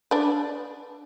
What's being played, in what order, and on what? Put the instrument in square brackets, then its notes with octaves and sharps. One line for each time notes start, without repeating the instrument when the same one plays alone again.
[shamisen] D4 B4